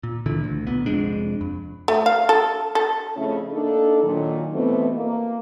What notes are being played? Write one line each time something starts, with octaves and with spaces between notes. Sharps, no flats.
A#2
C#2 A#2 D3 E3
D2
B1 A#2 B3
F1 F2 G#3 D4
F2
A3
F5
A4
A4
F2 C#3 A3 C#4 E4
A#3 D4 D#4 A4
A#2 D#3 F#3
B2 E3 A3 B3 C4
A#3